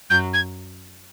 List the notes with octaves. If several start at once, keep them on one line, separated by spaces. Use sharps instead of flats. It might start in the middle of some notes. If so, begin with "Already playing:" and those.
F#2 F#3 G6
G#6